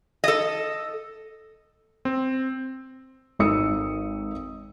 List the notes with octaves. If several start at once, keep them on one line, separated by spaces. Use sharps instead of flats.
A4 D#5
C4
G#1 D#4 A4 D#6 E6 C#7